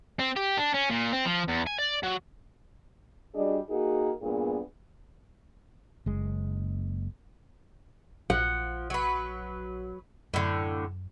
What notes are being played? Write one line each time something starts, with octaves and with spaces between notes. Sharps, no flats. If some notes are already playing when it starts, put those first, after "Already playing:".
C4
G4
D4
C#4
A#2
C4
F3
E2
G#5
D5
F#3
G3 D4 F#4 G#4 D#5
A#3 D#4 F#4 G#4 A#4
G2 A#2 B3 G#4
F#1 G#3
A#1 F3 F#5
F#3 B4
F#2 A2 D3